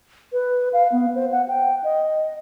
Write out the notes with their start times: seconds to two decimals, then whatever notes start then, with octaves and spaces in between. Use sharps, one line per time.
0.33 B4
0.73 F5
0.92 B3
1.15 C5
1.32 F#5
1.48 G5
1.84 D#5